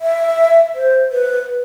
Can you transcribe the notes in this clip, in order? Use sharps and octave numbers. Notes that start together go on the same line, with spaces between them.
E5
C5
B4